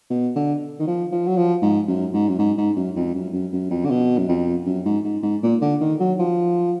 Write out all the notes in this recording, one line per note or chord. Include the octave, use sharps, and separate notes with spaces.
B2
D3
D#3
F3
F3
F#3
F3
G#2
F#2
G#2
F#2
G#2
G#2
F#2
F2
F#2
F#2
F#2
F2
D3
B2
F#2
F2
F#2
G#2
G#2
G#2
A#2
D3
D#3
F#3
F3